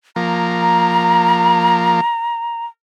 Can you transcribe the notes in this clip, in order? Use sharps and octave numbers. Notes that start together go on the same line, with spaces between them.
F3 A#3 A#5